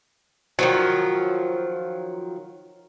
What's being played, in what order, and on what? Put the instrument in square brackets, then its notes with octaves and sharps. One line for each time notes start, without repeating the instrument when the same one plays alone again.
[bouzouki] D#3 F3 F#3